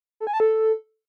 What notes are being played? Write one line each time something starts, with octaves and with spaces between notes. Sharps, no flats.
A4
G#5
A5
A4